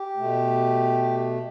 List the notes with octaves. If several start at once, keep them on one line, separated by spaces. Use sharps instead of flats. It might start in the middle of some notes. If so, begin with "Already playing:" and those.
Already playing: G4
B2 A3